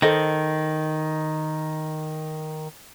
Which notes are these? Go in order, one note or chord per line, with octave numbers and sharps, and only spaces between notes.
D#3 A4 C5 D#5